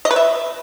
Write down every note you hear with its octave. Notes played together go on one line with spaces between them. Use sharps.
D#5
B4
E5